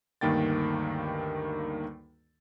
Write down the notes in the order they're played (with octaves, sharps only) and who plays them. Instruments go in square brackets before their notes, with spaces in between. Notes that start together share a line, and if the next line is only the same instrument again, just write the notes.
[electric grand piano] D2 G2 D#3 A#3 G5 A6